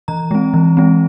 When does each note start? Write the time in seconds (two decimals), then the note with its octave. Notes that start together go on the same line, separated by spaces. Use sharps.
0.08 E3 A#5
0.31 G#3 C4
0.54 E3
0.77 G#3 C4